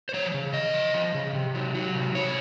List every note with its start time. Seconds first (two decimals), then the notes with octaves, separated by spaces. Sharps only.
0.09 C5
0.14 F3 C#5
0.34 C#3
0.54 C#3 D#5
0.74 F3
0.94 F3
1.14 C#3
1.35 C3
1.55 F#3
1.74 F#3
1.95 C3
2.14 C3 C#5